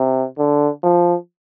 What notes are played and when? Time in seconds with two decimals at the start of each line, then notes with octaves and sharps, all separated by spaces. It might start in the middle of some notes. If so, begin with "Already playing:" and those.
Already playing: C3
0.38 D3
0.83 F3